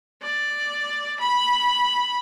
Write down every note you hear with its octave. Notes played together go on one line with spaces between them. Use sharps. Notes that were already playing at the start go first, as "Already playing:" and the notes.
D5
B5